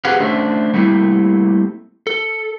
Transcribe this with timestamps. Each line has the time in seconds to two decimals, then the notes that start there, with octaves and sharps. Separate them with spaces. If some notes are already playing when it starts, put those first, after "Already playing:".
0.05 C4 G4 G#4 B4 F5 F#5
0.20 D3 A3 C#4 D4 C5 E5
0.74 G3 A3 A#3 C4 D#4 E4
2.07 A4